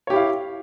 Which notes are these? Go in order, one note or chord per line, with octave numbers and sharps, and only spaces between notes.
E4 G4 C#5 F5